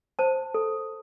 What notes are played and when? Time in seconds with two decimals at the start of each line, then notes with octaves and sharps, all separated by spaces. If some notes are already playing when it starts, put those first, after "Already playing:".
0.19 C5 A5
0.54 A4